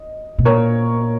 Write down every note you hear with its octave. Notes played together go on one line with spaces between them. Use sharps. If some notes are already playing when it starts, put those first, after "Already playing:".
Already playing: D#5
B2
A#2 A#4 C#5